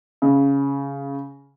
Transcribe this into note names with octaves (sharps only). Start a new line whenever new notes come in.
C#3